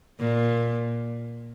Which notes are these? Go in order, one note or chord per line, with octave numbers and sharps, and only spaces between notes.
A#2